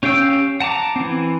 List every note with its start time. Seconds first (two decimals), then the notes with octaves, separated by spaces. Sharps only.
0.03 C#4 G4 F5 G5 E6
0.60 F#5 A5 A#5 D6
0.96 E3 C4